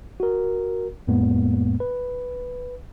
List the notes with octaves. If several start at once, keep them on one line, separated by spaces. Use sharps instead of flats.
F#4 A#4
F2 A2 G#3 A#3 B3
B4